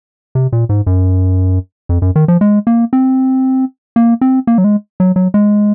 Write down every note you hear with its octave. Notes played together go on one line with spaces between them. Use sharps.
C3
A#2
G#2
F#2
F2
F#2
D#3
F3
G#3
A#3
C4
A#3
C4
A#3
F#3
G#3
F#3
F#3
G#3